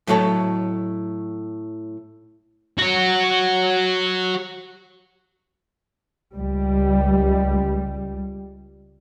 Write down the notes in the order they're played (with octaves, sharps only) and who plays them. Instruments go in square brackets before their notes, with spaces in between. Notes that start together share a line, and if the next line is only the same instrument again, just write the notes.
[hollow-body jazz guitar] A2 F#3 A4 C#5 A5
[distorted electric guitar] F#4 C#5
[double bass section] C#2 G3